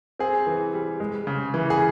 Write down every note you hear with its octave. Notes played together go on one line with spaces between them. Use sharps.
C4 G#4
E3
G3
G#3
C#3
E3
G#4